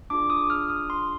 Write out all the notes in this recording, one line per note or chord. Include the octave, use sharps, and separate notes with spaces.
D4 F4 G#4 D6
D#6
F6
D#6
C6